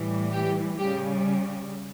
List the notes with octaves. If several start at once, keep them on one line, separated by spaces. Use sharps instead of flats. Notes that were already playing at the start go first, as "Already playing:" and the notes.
Already playing: A2 E3 G3
G4
C#3 G3 G4